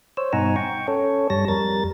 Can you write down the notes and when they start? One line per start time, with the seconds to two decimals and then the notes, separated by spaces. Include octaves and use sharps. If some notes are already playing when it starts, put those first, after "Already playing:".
0.17 C5 C#5 E6
0.33 G2 B2 D#4 F#5 G#5 A#5
0.56 G5 C#6
0.88 C#4 A4 C#5
1.30 G2 G3 C#5 A5 A#6
1.48 F2 G3 A#4 A6